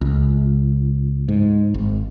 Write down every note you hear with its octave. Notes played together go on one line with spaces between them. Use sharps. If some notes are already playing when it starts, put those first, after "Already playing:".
C#2
G#2
G#1